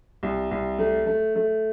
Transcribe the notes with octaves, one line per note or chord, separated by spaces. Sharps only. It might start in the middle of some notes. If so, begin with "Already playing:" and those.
C2
C2
A3
A3
A3